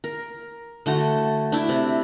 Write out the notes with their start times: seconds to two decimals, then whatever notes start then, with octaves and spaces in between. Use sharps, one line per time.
0.04 A#4
0.86 D3 A3 F#4
1.52 D4 E4
1.69 C3